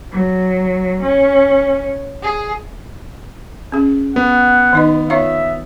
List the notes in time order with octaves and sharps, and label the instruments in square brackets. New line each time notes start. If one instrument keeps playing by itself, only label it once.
[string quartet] F#3
C#4
G#4
[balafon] C#4 G#4
[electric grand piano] B3 [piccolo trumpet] F#5
[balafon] D#3 D#4 D#5
[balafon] F4 C#5 F5 [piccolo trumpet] E5